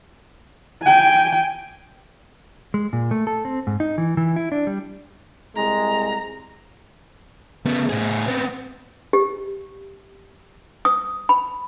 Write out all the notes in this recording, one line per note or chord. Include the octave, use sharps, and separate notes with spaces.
G5 G#5
G#3
A#2
A3
A4
C4
G#2
D#4
E3
E3
E4
D4
G3
C2 G#3 A#5
C#3 B3
A2 G#4
B3 C4
G4
D#6
B5